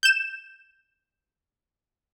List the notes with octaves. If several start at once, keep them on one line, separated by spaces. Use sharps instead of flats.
G6 E7